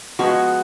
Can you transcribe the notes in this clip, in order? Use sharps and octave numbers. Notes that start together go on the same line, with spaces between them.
F3 G#3 B3 F#4